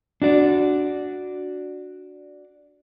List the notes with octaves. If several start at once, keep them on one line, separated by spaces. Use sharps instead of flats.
D4 F#4 D5